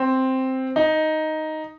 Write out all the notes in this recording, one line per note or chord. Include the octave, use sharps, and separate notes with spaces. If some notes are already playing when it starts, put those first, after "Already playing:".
Already playing: C4
D#4